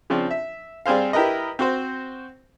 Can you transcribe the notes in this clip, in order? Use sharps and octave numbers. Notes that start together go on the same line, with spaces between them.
C#3 F3 C4 D4
E5
G3 C4 G#4 C5 F5
E4 G4 A#4 B4 D#5
C4 F#4 C5